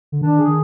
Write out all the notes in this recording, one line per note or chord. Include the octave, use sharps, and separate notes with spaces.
D3
D#3 D4
G#4
D#3